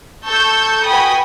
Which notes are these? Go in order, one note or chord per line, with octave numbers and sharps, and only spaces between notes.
A4 A5 C#6 E6 G6
F#4 B4 G5 G#5 B5 D#6